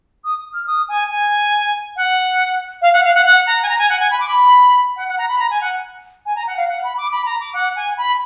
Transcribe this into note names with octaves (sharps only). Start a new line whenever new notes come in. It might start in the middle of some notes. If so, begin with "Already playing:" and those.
D#6
F6
D#6
G#5
G#5
F#5
F5
F#5
F5
F#5
F#5
A#5
G#5
A#5
G#5
F#5
G#5
B5
D6
B5
F#5
F#5
A#5
B5
A#5
G#5
F#5
G#5
A#5
F#5
F5
F#5
B5
D6
B5
A#5
D6
F#5
G#5
B5